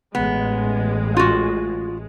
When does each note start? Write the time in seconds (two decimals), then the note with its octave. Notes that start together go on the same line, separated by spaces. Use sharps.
0.15 A1 G#3 B3
1.17 F4 F#4